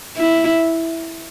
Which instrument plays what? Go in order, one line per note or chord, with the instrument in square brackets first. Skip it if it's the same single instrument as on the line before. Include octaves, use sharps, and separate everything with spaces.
[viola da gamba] E4